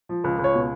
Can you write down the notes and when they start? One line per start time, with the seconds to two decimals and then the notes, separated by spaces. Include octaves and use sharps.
0.09 F3
0.24 C#2
0.39 C#2
0.44 C#5
0.54 B2